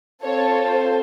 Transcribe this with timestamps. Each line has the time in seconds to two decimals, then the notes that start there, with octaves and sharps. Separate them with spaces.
0.23 C4 F4 A4 C#5
0.67 C5